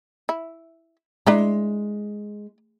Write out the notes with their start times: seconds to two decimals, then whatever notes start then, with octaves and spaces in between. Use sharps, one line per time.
0.29 E4
1.26 G#3 D4 E4 A#5